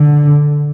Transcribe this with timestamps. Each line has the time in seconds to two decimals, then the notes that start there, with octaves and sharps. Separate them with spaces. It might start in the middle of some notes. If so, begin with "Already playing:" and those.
Already playing: D3